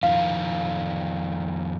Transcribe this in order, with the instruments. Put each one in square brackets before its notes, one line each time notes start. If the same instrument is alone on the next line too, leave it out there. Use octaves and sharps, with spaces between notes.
[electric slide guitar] F2 D#3 F4 [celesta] F5